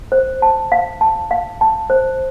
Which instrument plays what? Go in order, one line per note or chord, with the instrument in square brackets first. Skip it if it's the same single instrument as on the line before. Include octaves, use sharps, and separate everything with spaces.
[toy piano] C5
A5
F5
A5
F5
A5
C5